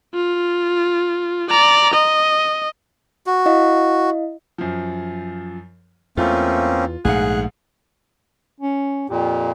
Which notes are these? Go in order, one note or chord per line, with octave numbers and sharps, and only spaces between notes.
F4
D5 A#5
D#5
F#4
E4 D#5 F5
F#2 F3
E2 A3 A#3 C4 C#4 F4
A#1 G#2 D3 A3 G#4 F5 F#5 F#6
C#4
F2 A#2 G4